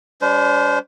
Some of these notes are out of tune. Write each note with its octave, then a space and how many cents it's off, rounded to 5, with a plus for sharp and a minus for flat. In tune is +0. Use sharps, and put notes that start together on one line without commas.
G3 +25 D4 -45 C5 -25